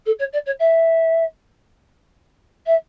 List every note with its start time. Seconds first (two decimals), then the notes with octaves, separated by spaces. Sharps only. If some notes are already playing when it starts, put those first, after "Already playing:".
0.06 A4
0.19 C#5
0.33 D5
0.46 C#5
0.59 E5
2.66 E5